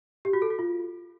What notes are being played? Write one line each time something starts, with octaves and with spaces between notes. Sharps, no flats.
G4
F#4
A4
F#4
F4